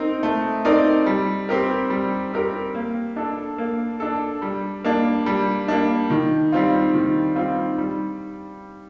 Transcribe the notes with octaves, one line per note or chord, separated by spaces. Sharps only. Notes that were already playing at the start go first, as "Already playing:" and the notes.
Already playing: C4 D#4 A#4
A3
C4 D#4 A#4 D5
G3
C4 G4 A#4
G3
C4 G4 A#4
A#3
D4 A4
A#3
D4 A4
G3
A#3 D4
G3
A#3 D4
D#3
G3 C4 F4
D#3
G3 C4 F4
G3